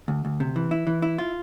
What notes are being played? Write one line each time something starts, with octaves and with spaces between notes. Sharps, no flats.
D2
D2
C3
E3
E4
E3
E4
F4